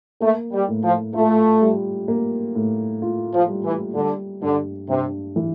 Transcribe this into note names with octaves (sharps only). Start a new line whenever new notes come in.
A3 A#3
G3
A2
F3
A3 F4
G3
A#3
A2
F4
F3
G3
E3
D3 G3
G2 D3
G2 C3
E3